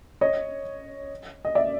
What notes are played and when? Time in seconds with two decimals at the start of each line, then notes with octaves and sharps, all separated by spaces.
0.21 C#5 D#5
1.45 D#5
1.55 D5 E5